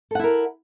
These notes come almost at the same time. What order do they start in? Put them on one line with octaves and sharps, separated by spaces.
A4 F#5 E4 A#4